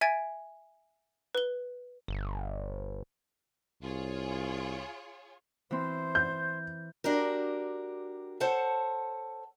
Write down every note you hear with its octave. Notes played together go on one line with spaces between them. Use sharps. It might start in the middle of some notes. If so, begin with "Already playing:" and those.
E5 G#5 G#6 A6 D7
B4 G7
G1
C2 F4 G#4 C#5
E3 C4 C5
G6
D4 F#4 G4 A#4
A4 C5 C#5 F#5 A5